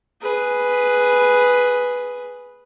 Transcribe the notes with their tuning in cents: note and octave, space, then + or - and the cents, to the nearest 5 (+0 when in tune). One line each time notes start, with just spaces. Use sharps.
G#4 +0 B4 +0